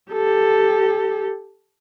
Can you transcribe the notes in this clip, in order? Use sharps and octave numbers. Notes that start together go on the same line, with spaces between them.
G4 A4